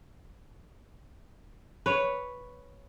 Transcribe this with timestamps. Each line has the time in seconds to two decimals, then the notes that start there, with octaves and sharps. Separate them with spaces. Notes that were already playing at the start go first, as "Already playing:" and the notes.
1.86 B4 C#5